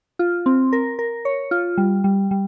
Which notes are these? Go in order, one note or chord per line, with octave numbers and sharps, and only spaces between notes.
F4
C4
A#4
A#4
C#5
F4
G3
G3
G3